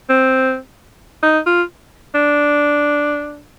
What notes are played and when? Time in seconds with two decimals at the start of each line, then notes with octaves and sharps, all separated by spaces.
0.09 C4
1.23 D#4
1.46 F4
2.15 D4